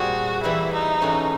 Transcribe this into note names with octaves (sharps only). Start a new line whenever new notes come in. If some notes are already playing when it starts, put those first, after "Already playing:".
Already playing: A#2 G3 C4 F4 F#4 G#4
E3 G3 A#3 E4
D#4
G#2 E3 A3 C#4